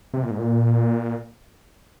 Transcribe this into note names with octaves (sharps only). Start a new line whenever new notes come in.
C3
A#2
G#2
A#2